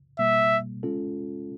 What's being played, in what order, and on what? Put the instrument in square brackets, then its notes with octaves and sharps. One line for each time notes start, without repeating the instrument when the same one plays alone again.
[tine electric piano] B2 G3 A#3 [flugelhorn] E5
[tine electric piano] G#3 C#4 F4 A4